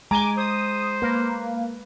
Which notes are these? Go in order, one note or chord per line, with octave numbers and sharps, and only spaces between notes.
G#3 G#5 A#5 D6 G7
C5 D#6
A#3 B4